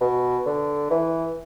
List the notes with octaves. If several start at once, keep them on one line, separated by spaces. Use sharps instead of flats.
B2
D3
E3